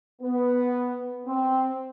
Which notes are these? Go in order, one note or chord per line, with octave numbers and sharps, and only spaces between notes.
B3
C4